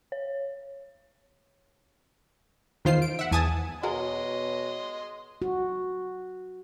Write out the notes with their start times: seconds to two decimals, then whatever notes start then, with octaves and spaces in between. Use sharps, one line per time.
0.12 C#5
2.85 E2 D#3 F4 C5 C7
3.02 D7
3.19 E5 F#5
3.31 E2 G#5 A5 D#6
3.83 B2 F#4 G#4 A#4 C#5 D#5 C6
5.42 F#4